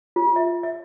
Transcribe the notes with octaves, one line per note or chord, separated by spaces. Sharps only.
F4
E5
E5